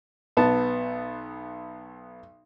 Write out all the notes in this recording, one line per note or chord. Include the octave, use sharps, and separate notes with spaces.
B1 B3 A5